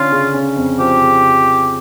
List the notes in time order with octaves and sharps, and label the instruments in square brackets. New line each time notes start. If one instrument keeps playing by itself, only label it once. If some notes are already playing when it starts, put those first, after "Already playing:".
Already playing: [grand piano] D3 C#4 [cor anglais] F4
[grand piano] C#3
C#4
F2
[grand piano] F3 [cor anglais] G4
[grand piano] C#3